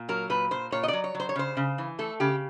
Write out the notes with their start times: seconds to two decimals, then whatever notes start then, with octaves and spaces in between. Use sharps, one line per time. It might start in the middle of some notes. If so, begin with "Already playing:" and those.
Already playing: A#2
0.09 F#3 A#4
0.30 A#2 B4
0.51 A#2 C5
0.72 A#2 C#5
0.83 D#5
0.88 F#3 D5
1.04 C#5
1.15 F#3
1.20 C5
1.29 C#5
1.36 C#3 C5
1.57 C#3
1.78 E3
1.99 A3 A4
2.20 C#3 G4